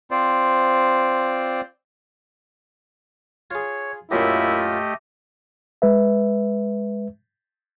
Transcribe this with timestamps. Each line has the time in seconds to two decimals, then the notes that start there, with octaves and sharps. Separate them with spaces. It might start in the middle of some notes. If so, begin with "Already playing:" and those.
0.11 C4 F4 C5 D5
3.51 F4 G#4 C#5
4.11 F#2 A#2 A3 E4 F4 G4 D#5 C6
5.82 G#3 B4 E5